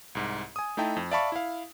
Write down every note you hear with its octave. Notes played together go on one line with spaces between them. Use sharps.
C2 G#2
G#5 D#6
A3 D#4 E4 G5 A5
F2
D5 E5 F5 A5 B5 C#6
E4 F5